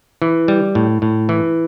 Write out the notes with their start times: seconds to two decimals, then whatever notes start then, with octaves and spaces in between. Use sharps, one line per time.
0.22 E3
0.48 G3
0.75 A2
1.02 A2
1.29 E3